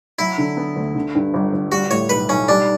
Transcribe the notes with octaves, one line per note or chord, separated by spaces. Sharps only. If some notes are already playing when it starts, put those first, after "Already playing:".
F#3 E4
D3
B3
D2
D3
G2
G1
G1
G3 F#4
A2 C#5
B1 B4
B1 C#4
G3 D4